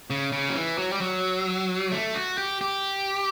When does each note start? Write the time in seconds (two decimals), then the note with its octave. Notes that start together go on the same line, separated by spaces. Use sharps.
0.10 C#3
0.32 C#3
0.49 F#3
0.55 E3
0.78 F#3
0.92 G3
1.01 F#3
1.92 A3
2.15 F#4
2.38 G4
2.61 G4